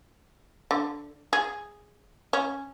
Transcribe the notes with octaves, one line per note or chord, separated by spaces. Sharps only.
D3
G#4
C#4